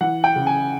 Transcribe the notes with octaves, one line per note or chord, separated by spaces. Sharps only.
E3 F#5
G5
C#3
G#5